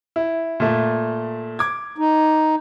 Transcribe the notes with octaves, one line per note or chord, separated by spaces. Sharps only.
E4
A#2 A3
D6 G#6
D#4